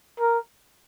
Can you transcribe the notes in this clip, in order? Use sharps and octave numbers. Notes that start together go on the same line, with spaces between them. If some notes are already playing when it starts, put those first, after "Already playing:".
A#4